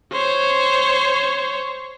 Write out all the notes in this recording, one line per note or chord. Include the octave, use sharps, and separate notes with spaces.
C5 C#5